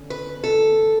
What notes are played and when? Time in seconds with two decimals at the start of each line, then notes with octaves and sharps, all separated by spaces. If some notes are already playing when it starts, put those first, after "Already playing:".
Already playing: E2 D3 C#4
0.10 B4
0.44 A4